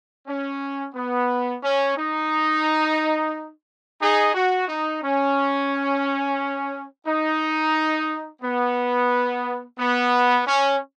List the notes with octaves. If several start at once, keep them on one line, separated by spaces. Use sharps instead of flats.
C#4
B3
C#4
D#4
D#4 G#4
F#4
D#4
C#4
D#4
B3
B3
C#4